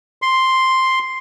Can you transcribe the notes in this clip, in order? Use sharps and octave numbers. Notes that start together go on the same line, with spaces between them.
C6